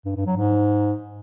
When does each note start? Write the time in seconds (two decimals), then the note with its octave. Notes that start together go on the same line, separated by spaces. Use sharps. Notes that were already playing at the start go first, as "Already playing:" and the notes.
0.05 G2
0.16 G2
0.26 F#3
0.37 G#2